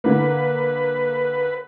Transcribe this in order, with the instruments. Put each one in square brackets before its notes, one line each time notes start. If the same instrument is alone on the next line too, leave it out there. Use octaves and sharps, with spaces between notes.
[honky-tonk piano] D3 A#3 [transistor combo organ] B4